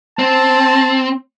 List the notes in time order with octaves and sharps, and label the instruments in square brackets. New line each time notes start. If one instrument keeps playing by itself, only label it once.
[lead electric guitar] C4 [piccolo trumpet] A5